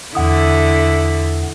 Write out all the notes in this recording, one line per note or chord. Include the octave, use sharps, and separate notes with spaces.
E2 D3 E4 F#5 D#6